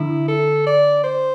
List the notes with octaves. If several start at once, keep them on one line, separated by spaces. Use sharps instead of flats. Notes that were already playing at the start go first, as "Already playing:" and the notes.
Already playing: D3 E4
A4
D5
C5